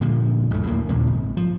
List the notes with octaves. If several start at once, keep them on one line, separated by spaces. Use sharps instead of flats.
A#2 D3 F3 G3
A1 F#2 A3
D1 D2 A2 A#3
D#2 A#2 C#3 F3
G#1
F3